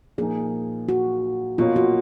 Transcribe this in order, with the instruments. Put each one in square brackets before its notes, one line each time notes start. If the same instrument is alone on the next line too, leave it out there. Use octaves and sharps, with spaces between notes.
[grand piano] A#2 F3 A#3 D#4 [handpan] G#4
[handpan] F#4
[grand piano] B2 A#3 C#4 [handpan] F4
[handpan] F#4